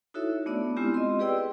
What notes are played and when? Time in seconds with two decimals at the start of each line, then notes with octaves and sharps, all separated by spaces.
0.14 D#4 E4 F#4 A4 C#5 E5
0.46 A3 B3 D4 D5
0.77 G#3 B3 C4 E4 F4 G4
0.94 D#5 C6
1.19 G4 G#4 B4 D5 G5 E6